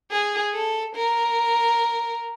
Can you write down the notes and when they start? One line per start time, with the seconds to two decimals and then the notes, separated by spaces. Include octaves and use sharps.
0.11 G#4
0.54 A4
0.95 A#4